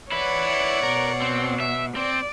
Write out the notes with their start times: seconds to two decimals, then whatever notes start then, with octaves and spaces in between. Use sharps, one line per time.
0.12 E4 B4 C#5 D5 F#5
0.83 B2 A#4
1.22 C4
1.60 E5
1.96 C4 D5